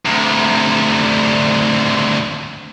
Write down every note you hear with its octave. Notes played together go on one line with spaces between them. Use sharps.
D2 C3